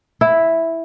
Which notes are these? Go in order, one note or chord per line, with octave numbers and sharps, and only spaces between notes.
E4